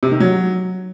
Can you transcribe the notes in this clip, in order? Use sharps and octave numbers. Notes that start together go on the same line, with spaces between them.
C3
D#3
F#3